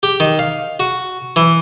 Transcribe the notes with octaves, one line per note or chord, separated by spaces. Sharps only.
G4
D#3
F5
F#4
E3